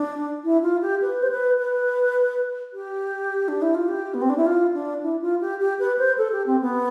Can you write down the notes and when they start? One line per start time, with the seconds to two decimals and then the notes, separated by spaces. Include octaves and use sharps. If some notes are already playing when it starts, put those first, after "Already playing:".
Already playing: D4
0.44 E4
0.63 F4
0.82 G4
1.02 B4
1.22 C5
1.31 B4
1.59 B4
2.74 G4
3.48 D4
3.62 E4
3.75 F4
3.89 G4
4.14 B3
4.22 C4
4.30 D4
4.37 E4
4.46 F4
4.74 D4
5.03 E4
5.22 F4
5.41 G4
5.61 G4
5.79 B4
5.99 C5
6.18 A4
6.32 G4
6.46 C4
6.61 B3